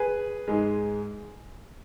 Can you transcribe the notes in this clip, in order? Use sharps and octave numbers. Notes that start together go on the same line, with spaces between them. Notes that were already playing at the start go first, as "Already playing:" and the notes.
Already playing: G#4 B4
G#2 G#3